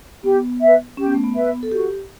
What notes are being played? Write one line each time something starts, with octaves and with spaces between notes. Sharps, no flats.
B3 G4
B4 E5
C#4 G4
B3
A3
B3
B4 E5
A4
F#4 G4